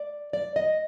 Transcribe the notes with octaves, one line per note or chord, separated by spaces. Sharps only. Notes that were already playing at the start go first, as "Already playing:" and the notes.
Already playing: D5
D5
D#5